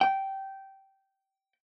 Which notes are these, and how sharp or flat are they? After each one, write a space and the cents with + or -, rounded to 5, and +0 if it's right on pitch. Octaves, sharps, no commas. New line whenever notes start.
G5 -15